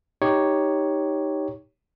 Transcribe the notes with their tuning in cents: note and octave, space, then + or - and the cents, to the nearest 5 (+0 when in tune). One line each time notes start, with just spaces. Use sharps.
D#4 +0 G4 +0 C#5 +0